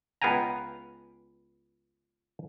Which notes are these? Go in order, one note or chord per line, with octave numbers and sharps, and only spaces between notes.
C#2 B3 F5 G5 G#5 A#5